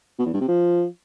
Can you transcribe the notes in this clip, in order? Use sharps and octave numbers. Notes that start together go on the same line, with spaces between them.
B2
E2
G2
C3
F3